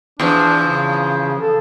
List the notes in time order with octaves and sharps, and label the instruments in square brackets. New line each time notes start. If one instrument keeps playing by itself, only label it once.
[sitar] E2 F3 [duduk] D4
[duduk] C#3
A4